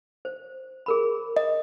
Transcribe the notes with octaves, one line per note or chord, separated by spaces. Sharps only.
C5
G#4 A#4 B5
D#5